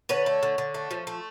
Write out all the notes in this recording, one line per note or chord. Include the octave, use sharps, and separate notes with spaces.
D3 B4 C#5
A3
D3
D3
A3
F3
A3